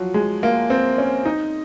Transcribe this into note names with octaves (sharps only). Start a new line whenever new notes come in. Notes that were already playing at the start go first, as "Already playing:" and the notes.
Already playing: F3 F#3
G#3
A#3
C4
C#4
D#4